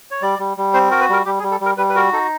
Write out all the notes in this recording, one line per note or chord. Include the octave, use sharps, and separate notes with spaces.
C#5
G3 D5
G3
G3
C4 C5
F#4 A#4
B4
G3 A#4
G3 G4
G#4
G3
A4
G3 A#4
G3 B4
B4
F#4 A#4
D#4 A4